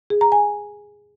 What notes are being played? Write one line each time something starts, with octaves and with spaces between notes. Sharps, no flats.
G#4
A#5
G#5